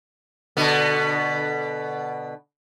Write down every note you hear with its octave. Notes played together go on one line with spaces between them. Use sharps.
B2 D3 B3